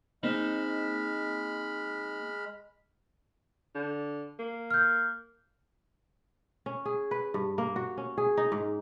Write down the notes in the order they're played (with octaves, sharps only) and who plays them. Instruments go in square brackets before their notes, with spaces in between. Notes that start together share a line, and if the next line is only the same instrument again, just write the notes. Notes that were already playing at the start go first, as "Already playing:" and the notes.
[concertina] G#3 B5 F6 [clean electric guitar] A#3 C4 D#4
[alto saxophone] D3
A#3
[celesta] F6 G6
[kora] C#4
G#4
B4
G2
A#3
F#4
C#4
G#4
D#4
G#2